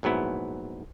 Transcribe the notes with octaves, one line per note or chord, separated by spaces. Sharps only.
A#1 G#2 F#3 B3 E4